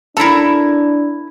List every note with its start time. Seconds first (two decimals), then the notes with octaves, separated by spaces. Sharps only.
0.17 D4 E4 A4 A#4 A#5